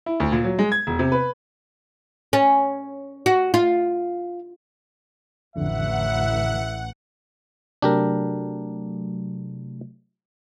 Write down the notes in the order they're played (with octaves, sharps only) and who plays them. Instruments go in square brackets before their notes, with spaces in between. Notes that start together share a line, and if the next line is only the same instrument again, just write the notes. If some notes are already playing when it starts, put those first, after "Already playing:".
[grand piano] E4
D2
A#2
F#3
G#3
G#6
E1
C3
B4
[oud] C#4
F#4
F4
[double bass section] A1 [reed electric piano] F2 D3 [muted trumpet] E5 [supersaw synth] F#5
[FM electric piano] C3 F#3 A3 [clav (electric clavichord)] D4 G4 A#4